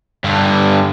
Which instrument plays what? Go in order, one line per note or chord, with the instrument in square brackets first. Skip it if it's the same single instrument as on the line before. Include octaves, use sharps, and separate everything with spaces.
[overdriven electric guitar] G2 D3